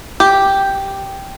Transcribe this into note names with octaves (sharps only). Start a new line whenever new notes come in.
G4